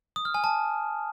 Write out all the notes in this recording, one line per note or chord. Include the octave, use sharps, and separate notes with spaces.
D#6
F6
G#5
A5